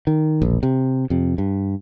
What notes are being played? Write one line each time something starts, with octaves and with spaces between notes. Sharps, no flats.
D#3
E1 A#1
C3
F2 C3
G2